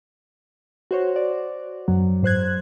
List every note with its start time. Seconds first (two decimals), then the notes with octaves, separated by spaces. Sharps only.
0.91 F#4 C5 C#5
1.16 D5
1.88 F#2 F#3
2.23 G#2 C5 F#6 G#6